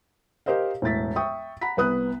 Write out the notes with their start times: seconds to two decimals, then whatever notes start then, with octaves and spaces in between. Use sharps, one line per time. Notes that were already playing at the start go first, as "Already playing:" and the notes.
0.46 G4 A#4 C5 D#5 F5
0.82 E1 A2 A6 B6
1.16 E5 G5 C#6 D#6
1.61 F#5 A#5 B5 B6
1.77 C2 B3 D#6 F#6